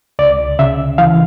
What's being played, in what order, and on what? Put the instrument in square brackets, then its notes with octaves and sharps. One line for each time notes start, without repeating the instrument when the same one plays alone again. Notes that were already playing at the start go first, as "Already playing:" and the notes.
[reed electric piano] C#2 D5
C#3 E5
E3 F5